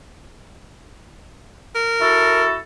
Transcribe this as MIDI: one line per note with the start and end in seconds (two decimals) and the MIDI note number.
1.75 2.45 70
2.00 2.57 64
2.00 2.57 66
2.00 2.57 69